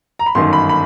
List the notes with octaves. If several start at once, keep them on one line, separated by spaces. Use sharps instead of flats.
A#5
B5
G1 F#2 D#3 C6
B5
B5